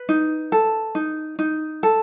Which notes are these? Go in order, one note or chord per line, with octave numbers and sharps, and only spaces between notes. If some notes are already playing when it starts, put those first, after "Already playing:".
Already playing: B4
D#4
A4
D#4
D#4
A4